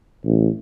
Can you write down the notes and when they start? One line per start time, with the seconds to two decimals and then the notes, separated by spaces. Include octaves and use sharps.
0.25 A1